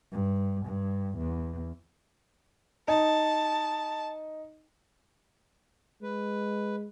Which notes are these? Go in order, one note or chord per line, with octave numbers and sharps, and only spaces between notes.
G2
G2
E2
D#4 A5
G#3 B4